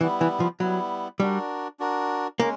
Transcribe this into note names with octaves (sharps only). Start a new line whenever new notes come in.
E3 G3 B3 E4
E3
F3
F#3 G3 B3 E4
G3 D4 F#4 A#4
D4 F#4 A#4
G#3 A#3 C#4